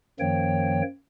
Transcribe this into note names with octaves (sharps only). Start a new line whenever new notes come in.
F#2 D#3 F3 A#3 C#5 G5